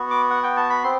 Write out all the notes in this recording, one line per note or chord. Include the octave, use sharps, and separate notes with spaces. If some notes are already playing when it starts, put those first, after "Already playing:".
Already playing: B3 F#4
D6
F#5
G5
A5
B5
C4 C6